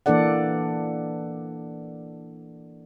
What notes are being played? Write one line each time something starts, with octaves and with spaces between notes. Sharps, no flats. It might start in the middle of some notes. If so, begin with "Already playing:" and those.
E3 A#3 D4 A4 D5 F#5